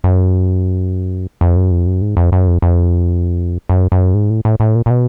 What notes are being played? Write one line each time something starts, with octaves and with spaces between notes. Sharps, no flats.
F#2
F2
F#2
F2
F#2
G#2
F2
F#2
F2
F2
F#2
F#2
G#2
A2
A2
A2
A#2
A#2
B2